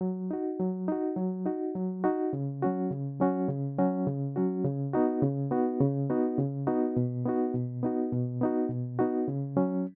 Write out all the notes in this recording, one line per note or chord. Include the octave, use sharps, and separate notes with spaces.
F#3
D#4 F#4
F#3
D#4 F#4
F#3
D#4 F#4
F#3
D#4 F#4
C#3
F#3 C#4 F#4
C#3
F#3 C#4 F#4
C#3
F#3 C#4 F#4
C#3
F#3 C#4 F#4
C#3
B3 D#4 F#4
C#3
B3 D#4 F#4
C#3
B3 D#4 F#4
C#3
B3 D#4 F#4
B2
B3 D#4 F#4
B2
B3 D#4 F#4
B2
B3 D#4 F#4
B2
B3 D#4 F#4
C#3
F#3 C#4